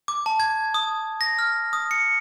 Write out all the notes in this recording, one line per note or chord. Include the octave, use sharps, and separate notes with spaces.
D6
A5
G#6
D#6
A#6
F6
D#6
C#7